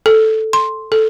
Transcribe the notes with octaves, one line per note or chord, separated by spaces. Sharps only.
A4
C6
A4